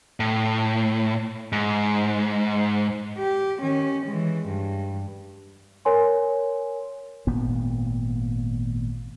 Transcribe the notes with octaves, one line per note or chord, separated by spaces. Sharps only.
A2
G#2
G4
D#3 C#4
E3 G#3
G2
A#4 C#5 G#5 C6
G#1 A#2 B3